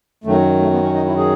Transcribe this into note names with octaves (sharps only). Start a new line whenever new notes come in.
F#2 D#3 F#3 A3
A3
B3
C#4
D#4
E4
G#4